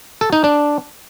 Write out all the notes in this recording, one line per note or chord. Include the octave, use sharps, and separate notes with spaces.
A4
D#4
D4